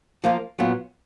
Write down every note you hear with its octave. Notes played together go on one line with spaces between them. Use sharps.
F3 A#3 F4
A#2 F#3 B3 F4